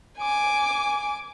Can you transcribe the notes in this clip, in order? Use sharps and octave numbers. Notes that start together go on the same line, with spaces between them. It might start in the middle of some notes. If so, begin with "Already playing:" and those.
G#5 D6